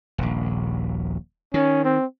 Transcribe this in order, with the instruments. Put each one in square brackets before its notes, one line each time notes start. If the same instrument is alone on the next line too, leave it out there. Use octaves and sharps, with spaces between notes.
[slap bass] D#1 A#1
[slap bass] D#3 [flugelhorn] C#4
[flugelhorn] C4